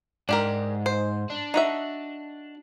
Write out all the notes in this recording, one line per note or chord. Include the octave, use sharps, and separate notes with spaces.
G#2 D4 G4 A#4
C5
D4
D#4 F#4 E5